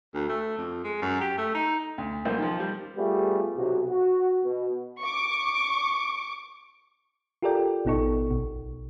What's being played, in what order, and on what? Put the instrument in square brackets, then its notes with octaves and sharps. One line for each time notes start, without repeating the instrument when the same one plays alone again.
[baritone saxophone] D2
A3
F2
G#3
F#2
G4
A3
D#4
[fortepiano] D2
B1 A#3 C5
D#3 F3
G3 C5
[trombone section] G3 A3 B3 F4 G4 G#4
B1 C3 F#4
F#4
B2 F#4
[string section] C#6 D6
[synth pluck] F4 G4 A4 A#4 D5 G5
A1 B2 B3 D#4 A4 C#6
B1 B2